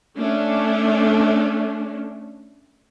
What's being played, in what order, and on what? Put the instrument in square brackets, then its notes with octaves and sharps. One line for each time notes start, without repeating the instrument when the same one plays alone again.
[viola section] A3 C#4 D4